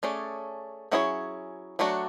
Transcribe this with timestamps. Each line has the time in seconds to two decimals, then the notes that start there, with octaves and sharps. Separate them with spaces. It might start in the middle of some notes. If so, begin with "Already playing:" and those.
0.03 A3 C#4 G#4 D5
0.92 F#3 C#4 E4 G#4 C#5
1.79 F#3 A3 D4 F#4